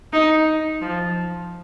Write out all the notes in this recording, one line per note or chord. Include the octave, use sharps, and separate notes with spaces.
D#4
F3